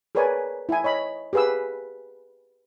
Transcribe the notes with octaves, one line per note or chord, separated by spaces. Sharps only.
G#4 A#4 B4 C#5 D5 G#5
E4 G#5
C#5 D#5 B5
G4 G#4 B4 F5 E6